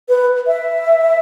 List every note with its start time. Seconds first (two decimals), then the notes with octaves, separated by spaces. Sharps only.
0.09 B4
0.47 E5